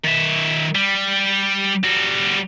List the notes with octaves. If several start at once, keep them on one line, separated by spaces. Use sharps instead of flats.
D#3 E5
G3
G3 F#4